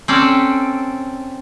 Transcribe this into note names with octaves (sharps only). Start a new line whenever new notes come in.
C4 C#4 A4 D5